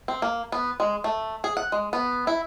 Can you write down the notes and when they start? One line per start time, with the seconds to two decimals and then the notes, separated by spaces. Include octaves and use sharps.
0.08 C4
0.22 A#3
0.52 B3
0.80 G#3
1.04 A3
1.44 G#4
1.57 F#5
1.72 G#3
1.93 B3
2.27 E4